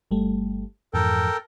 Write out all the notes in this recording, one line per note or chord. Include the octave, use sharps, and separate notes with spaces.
G1 G3 A3
F2 G#2 E3 A4 A#4 G5